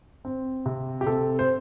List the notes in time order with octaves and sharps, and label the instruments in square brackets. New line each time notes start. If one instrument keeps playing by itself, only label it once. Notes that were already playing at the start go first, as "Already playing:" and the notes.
[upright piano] C4
C3
G4
C3 A4
C5